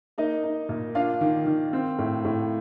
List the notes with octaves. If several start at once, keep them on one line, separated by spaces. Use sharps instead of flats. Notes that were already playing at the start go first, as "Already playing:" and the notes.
A#3 D#4 D#5
D#4
A#2
D4 F4 F5
D#3
D#3
C4
A2
A2